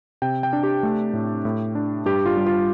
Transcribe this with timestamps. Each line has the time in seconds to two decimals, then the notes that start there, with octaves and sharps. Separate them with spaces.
0.22 C3 G5
0.43 G5
0.53 D4
0.63 G4
0.83 A3
1.14 A2
1.45 A2
1.75 D4
2.05 G2 G4
2.26 F4
2.37 G3
2.47 F4